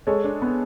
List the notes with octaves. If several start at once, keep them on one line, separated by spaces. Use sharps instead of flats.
G#3 A4 C#5
D4
B3